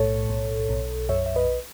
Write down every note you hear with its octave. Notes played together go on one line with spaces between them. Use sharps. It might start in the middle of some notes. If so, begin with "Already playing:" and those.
Already playing: B1 A2 A4 C#5
B1
B1
F#2 C#5 E5
E5
B4 D#5